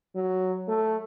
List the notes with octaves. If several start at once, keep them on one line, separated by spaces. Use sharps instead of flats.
F#3
A3